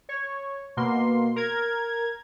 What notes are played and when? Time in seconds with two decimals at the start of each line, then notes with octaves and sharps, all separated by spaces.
0.09 C#5
0.77 B2 A#3 C6
1.36 A#4 G#6